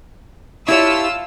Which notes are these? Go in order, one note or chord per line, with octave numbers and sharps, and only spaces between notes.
E4 F4 G4 C#5 A5 E6